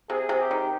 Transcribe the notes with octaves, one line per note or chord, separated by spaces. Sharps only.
C3 G#4
C3
G4
D#3